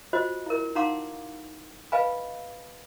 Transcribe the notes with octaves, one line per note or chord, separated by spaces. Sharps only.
F4 F#4 C5 D#5
E4 A#4
D#4 F5 F#5 A#5 C6 D6
B4 D#5 F5 G#5 B5